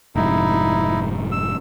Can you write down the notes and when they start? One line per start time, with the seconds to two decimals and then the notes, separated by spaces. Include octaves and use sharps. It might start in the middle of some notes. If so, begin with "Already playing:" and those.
0.16 F1 G#2 D#4 E4
1.32 E6